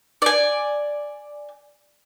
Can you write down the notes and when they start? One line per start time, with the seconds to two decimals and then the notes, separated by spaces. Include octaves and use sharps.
0.22 D5 G#5